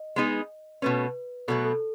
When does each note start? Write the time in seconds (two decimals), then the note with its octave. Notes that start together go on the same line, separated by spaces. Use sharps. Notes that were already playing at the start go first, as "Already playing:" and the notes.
Already playing: D#5
0.16 G#3 B3 D#4 G#4
0.82 B2 A3 C#4 B4
1.48 B2 F#3 A3 A4
1.65 A4